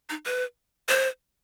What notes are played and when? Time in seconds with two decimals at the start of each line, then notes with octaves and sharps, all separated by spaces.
0.09 D#4
0.25 B4
0.89 C5